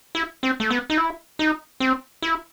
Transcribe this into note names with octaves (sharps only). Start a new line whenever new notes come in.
E4
C4
A3
B3
D#4
E4
D#4
C4
E4